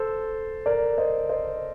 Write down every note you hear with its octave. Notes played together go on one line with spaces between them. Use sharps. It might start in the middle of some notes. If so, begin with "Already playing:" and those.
Already playing: A4 C5
A#4 D5
C5 D#5
C5 D#5